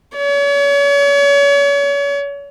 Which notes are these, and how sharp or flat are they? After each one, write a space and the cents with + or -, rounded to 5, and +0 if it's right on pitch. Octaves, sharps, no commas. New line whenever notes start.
C#5 +35